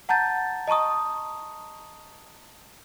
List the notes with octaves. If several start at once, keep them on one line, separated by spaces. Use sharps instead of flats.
F#5 A5 A#5 G6 A6
D#5 A5 A#5 C#6 D#6